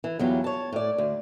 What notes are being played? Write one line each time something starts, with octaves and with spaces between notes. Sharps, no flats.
E3
E2 F#3 G3 F4
C#5 A5
A2 D5
D2